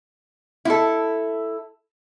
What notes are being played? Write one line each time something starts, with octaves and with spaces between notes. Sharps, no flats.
E4 A4